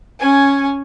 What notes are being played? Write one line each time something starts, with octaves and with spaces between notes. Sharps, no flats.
C#4 G#5